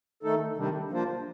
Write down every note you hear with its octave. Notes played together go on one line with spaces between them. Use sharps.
D#3 A3 D#4 A4
C3 D#3 G3 D4
F3 A#3 D4 F4 C5